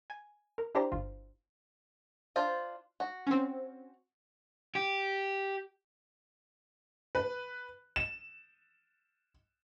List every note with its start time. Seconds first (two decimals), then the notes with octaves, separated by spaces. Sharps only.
0.10 G#5
0.58 A#4
0.75 D4 E4 G4 C5 A#5
0.92 G1 F4
2.36 D4 F4 C5
3.00 F#4
3.27 C4 C#4
4.75 G4
7.15 B4
7.96 E7